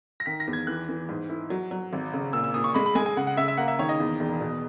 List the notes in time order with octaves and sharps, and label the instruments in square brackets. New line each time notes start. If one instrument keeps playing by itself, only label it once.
[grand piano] A#6
[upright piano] D#3 [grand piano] B6
[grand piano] A#6
[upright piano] E2
[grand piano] G#6
[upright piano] E3 [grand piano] F#6
[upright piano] E3
G#2
E4
F#3
F#3
G#1
C#3
[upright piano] A#2 [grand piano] E6
[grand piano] E6
[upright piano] A#2 [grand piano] D#6
[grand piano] C#6
[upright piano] G#3 [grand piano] B5
[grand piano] B5
[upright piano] G#3 [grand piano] G#5
[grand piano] G#5
[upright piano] C#3 [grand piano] F#5
[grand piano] F#5
[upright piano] C#3 [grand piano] E5
[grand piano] E5
[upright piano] A#3 [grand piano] F#5
[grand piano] E5
[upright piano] D#3 [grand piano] C#5
[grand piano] D#5
[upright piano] E2
E1
B2